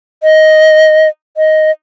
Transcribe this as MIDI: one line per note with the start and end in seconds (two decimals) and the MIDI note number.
0.23 1.08 75
1.37 1.71 75